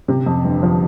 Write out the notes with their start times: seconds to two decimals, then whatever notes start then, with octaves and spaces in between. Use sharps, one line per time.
0.08 C3
0.26 F2
0.44 G1
0.63 F3